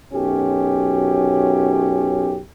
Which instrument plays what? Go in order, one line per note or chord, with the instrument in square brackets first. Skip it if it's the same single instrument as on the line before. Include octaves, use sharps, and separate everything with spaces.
[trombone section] B1 F#2 C#4 G4